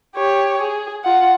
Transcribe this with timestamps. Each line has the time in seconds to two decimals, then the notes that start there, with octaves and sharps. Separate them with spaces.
0.16 G4 C#5
0.61 G#4
1.05 F4 F#5